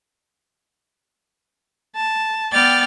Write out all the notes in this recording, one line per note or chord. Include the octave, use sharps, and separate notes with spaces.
A5
B3 D5 G5 F6 A6